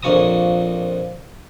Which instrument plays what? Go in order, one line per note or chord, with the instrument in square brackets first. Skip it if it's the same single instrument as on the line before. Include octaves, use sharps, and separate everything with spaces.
[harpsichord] A#1 F2 F4 C#5 A#5 D#6